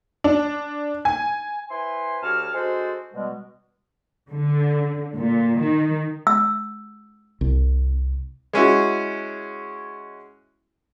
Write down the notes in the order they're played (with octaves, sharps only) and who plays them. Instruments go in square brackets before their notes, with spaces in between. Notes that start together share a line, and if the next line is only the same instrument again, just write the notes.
[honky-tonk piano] D4
G#5
[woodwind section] E4 B4 C5 G#5 C6
D2 F#4 G4 C#5 A5 F6
G#3 D4 F#4 A4 C5
B2 G3 G#3 B3
[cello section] D3
A#2
D#3
[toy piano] E6
[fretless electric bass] C2
[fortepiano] G#3 C#4 E4 F#4